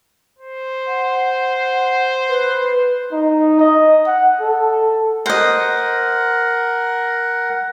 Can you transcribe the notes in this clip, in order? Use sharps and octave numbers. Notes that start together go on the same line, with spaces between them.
C5
F#5
B4
D#4
D#5
F#5
A4
A#4 C5 D#5 F#5